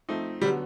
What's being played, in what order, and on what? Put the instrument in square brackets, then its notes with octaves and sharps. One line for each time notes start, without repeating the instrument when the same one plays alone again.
[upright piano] F3 A3 C4 D#4
[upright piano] D3 F#3 B3 [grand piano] G3